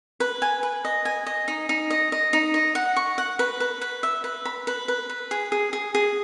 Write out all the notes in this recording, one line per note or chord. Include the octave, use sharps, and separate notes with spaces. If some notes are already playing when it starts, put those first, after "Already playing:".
B4
G#5
B4
D#5
G#5
D#5
D#4
D#4
D#5
D#5
D#4
D#5
F#5
C#6
F#5
B4
B4
B4
E5
B4
B5
B4
B4
B4
G#4
G#4
G#4
G#4